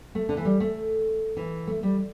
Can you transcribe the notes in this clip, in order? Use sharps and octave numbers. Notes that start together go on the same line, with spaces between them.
A3
D3
E3
G3
A3
E3
A3
G3